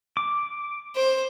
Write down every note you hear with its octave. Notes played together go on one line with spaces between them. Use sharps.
D6
C5